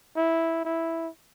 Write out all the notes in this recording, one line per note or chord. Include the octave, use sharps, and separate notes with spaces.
E4
E4